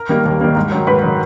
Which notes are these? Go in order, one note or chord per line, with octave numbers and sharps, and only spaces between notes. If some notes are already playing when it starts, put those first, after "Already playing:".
Already playing: A#4 A#5
D#3 G3 A#3
D#2
D#3 G3 A#3
G#2
D#3 F#3
G#2 B4 B5
D#3 F#3